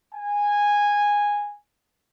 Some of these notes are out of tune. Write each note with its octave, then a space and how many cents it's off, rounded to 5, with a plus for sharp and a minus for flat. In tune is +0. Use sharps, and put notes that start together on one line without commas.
G#5 -10